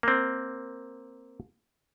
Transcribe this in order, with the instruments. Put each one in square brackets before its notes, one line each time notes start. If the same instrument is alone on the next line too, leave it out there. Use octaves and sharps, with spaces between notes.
[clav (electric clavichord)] A#3 C4